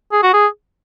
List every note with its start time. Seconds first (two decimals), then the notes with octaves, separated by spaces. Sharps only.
0.12 G#4
0.23 F#4
0.34 G#4